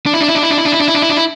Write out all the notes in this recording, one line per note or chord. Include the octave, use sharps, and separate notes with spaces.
D4
E4
D4
E4
D4
E4
D4
E4
D4
E4
D4
E4
D4
E4
D4
E4